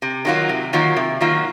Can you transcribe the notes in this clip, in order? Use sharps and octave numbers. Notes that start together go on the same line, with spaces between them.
C3
D#3 F#3 A#3 F4
C3
D#3 F#3 A#3 F4
C3
D#3 F#3 A#3 F4